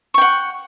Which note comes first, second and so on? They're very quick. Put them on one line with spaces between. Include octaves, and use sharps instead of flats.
C#6 G5 F#5